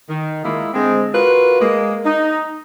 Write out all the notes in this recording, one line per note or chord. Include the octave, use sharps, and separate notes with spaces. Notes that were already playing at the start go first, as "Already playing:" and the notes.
D#3
G#3 A#3 E4 F4
D3 G#3 C4
F4 F#4 A#4 B4
G#3 A#3
D#4